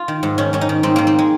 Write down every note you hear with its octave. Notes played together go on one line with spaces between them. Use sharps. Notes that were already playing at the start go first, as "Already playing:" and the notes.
Already playing: F4
D#3
G#2
D#3 C#4
G#2 C#4
D#4
D#3
G#2 C4
D#3 A#3
C4
G#3